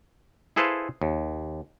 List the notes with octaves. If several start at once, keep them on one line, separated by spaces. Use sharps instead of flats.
E4 G#4 A4 B4 C5 F5
D#2